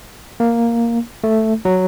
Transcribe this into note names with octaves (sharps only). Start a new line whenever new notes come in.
A#3
A3
F#3